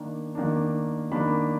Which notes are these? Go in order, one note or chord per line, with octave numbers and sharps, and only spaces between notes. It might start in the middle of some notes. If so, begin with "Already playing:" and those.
Already playing: D#3 A#3 D4
D#3 A#3 D4
D#3 A#3 D4 B5